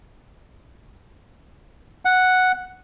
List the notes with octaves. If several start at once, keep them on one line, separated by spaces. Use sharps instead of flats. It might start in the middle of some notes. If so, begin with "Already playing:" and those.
F#5